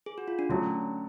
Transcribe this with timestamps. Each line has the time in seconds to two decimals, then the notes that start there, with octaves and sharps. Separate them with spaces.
0.06 G#4
0.18 F#4
0.28 F4
0.39 D4
0.49 D3 F#3 A3 C#4